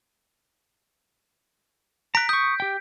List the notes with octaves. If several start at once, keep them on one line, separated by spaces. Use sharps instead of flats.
A#5 F#6 B6 D7
C#6 D#6 G6
G4 G5